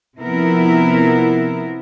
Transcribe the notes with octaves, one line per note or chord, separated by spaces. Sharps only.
C3 F3 B3 E4 A#4